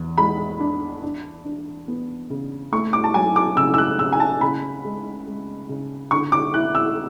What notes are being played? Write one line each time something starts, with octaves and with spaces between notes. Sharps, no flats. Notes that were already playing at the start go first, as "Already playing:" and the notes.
Already playing: E2
G#3 B5
D4
D4
D4
B3
C#3
A3 C#6
D6
A5
F#3 G#5
D6
C#3 E6
E6
F#6
C#3 E6
G#5
A5
C#3 B5
G#3
G#3
C#3
D3 C#6
D6
E4 F#6
E6